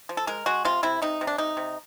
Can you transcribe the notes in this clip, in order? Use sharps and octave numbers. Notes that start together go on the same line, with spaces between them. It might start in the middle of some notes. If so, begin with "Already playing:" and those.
F3
A4
G#3 A#4
G#3 F#4
C3 F4
C3 E4
C3 D#4
C3
D4
C3 D#4
C3